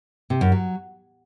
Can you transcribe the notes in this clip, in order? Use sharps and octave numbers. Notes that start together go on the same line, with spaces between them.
C3
F#2
F#3